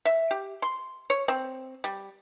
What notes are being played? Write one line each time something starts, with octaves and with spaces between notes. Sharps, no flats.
E5
G4
C6
C#5
C4
G3